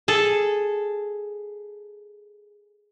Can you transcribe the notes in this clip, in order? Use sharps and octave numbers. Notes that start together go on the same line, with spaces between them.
G#4 A4